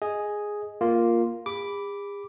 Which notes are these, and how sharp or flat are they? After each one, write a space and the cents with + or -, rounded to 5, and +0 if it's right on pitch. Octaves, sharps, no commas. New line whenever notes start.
G#4 +0 D#5 +0
A#3 +0 F4 +0
G#4 -45 B5 +0 D6 -5